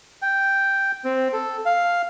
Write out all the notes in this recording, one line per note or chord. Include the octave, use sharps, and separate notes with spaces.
G5
C4
A4
F5